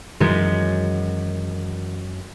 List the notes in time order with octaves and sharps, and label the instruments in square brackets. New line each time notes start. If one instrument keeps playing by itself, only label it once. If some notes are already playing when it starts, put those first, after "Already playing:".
[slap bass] F#2 [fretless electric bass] D#3 F#3 [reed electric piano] E3 A#4 [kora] G#3